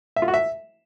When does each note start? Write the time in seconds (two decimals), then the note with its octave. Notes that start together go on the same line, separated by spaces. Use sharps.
0.16 E5
0.22 F4
0.28 F#4
0.34 E5